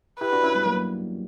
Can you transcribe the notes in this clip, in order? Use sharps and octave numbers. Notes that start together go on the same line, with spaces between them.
E4 G4 B4
D4 F#4
C#4 E4
G3 B3
F#3 A#3